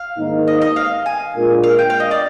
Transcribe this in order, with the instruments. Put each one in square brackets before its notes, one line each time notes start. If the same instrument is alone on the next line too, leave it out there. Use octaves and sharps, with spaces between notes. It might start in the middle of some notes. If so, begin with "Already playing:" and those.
Already playing: [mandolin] F5
[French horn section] G#2 D#3 A#3 D#4
[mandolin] D#5
D#5
F5
G#5
[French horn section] A#2 G#3 D4 F4 A#4
[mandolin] F5
G5
F5
D#5
D5